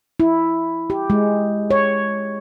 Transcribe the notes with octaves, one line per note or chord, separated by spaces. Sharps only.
E4
G4
G#3
C#5